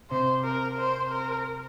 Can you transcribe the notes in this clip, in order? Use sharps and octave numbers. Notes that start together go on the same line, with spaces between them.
C3 C5
A#4
C5
A#4